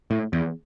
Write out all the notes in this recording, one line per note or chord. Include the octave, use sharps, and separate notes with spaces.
A2
E2